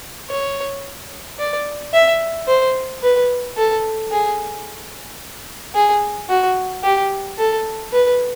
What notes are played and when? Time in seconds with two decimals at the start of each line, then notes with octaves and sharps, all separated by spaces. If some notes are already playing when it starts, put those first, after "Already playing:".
0.30 C#5
1.39 D5
1.94 E5
2.48 C5
3.03 B4
3.57 A4
4.12 G#4
5.75 G#4
6.29 F#4
6.83 G4
7.38 A4
7.93 B4